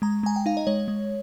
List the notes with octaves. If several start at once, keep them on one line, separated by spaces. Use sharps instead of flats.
G#3 A#5
G#3 G#5
G5
D#4 F5
D#5
G#3 C#5
G#3